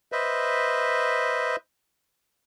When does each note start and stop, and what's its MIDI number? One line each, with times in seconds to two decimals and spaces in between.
0.12 1.56 71
0.12 1.56 72
0.12 1.56 75
0.12 1.56 76